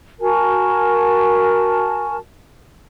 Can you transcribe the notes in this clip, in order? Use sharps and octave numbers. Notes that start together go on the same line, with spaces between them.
F#4 A#4 G#5 A5